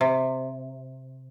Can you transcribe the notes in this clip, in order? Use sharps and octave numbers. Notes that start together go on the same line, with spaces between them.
C3